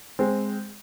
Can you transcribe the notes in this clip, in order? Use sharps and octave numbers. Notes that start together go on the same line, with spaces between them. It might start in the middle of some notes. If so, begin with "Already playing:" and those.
G#3 C4